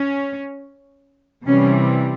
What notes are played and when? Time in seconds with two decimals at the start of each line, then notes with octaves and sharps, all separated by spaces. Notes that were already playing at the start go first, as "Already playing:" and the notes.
Already playing: C#4
1.46 C3 E3 G3 C#4